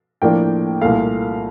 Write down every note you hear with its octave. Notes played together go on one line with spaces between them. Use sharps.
A2 F3 A#3 D4 G5
C2 A#2 A3 F5